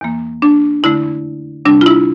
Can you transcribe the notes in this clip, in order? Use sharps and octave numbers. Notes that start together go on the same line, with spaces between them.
E2 E3 A#3
D4
F2 D3 A3 E4
C3 G3 C4 D4
F4
E4